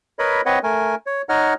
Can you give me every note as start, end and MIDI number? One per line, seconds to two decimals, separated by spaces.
0.19 0.41 70
0.19 0.41 71
0.19 0.41 73
0.19 0.41 75
0.19 0.41 83
0.46 0.59 60
0.46 0.59 71
0.46 0.59 73
0.46 0.59 75
0.46 0.59 78
0.63 0.95 57
0.63 0.95 70
0.63 0.95 80
1.06 1.22 73
1.29 1.54 63
1.29 1.54 73
1.29 1.54 75
1.29 1.54 78
1.29 1.54 89